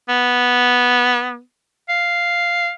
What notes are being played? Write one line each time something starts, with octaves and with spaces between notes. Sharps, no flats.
B3
F5